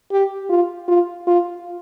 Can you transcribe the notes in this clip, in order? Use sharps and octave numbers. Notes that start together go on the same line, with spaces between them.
G4
F4
F4
F4